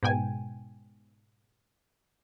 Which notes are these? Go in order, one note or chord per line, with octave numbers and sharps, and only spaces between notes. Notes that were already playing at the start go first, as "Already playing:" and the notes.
G#2 B2 G5 G#5